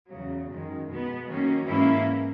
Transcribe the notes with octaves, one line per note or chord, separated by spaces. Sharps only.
E2 C#3 F#3
F#2 D#3 G#3
B2 G#3 B3
F#2 D#3 F#3 A#3 C#4
G#2 E3 A#3 C#4 E4